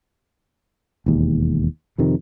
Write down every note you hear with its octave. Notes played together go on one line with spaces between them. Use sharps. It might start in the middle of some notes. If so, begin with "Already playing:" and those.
E1 D#2
F2 C3 D#3